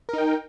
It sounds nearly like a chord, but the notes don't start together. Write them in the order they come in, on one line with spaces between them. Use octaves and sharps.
A#4 D#4 G5